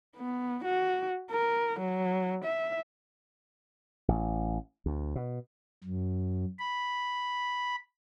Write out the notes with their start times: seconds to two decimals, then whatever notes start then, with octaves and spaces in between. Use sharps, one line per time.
0.17 B3
0.64 F#4
1.31 A#4
1.80 F#3
2.44 E5
4.08 A1
4.86 D2
5.16 B2
5.84 F#2
6.59 B5